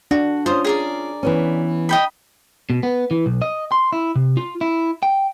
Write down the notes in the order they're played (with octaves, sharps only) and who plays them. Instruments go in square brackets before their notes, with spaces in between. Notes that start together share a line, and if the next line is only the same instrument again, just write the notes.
[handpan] D4 [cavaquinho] F#4
[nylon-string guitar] C#4 F4 [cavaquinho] C5 D#6
[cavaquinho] G#4 A#4 D5
[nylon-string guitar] E3 B3 C#4
[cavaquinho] D#5 G5 B5
[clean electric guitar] B2
B3
E3
B1
D#5
C6
E4
C3
F4
E4
G5